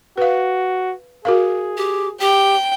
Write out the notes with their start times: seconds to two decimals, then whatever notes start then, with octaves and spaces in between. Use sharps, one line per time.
0.17 F#4 B4 F5
1.25 F#4 G#4 A#4 F5
1.77 G4
2.21 G4 G5